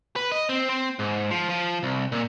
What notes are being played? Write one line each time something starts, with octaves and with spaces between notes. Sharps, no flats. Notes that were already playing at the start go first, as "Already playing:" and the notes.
B4
D#5
C4
C4
G#2
F3
F3
C2
A#2